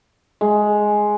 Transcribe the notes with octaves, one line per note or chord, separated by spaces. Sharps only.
G#3